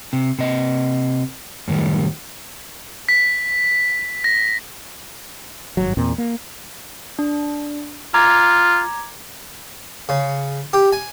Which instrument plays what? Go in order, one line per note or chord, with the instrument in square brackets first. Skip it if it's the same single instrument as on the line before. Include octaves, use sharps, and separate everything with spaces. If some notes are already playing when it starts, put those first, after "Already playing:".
[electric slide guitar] C3
C3 D#5
F#2 A2 D#3 G3
[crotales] B6
A#6
[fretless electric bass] G#1 G2 F#3
E2 A#2 C4
A#3
[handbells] D4
[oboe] F4 [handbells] A#5 D6 G#6
[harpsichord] C#3
G4
G#5